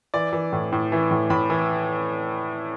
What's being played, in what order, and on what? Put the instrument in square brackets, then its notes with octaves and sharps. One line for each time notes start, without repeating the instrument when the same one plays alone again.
[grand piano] E3 D5
E3
A2
A2
E3
A2
A2 B5
E3